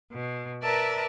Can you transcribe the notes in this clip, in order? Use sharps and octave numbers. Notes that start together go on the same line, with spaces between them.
B2
A#4 B4 D5 E5 A5 A#5